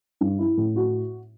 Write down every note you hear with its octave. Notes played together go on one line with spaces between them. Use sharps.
G2
E4
A2
F#4